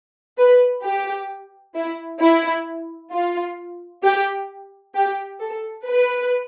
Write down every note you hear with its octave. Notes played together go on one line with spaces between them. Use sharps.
B4
G4
E4
E4
F4
G4
G4
A4
B4